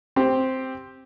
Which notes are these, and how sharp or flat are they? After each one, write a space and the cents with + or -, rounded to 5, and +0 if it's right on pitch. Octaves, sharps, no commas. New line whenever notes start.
C4 +0 G4 +0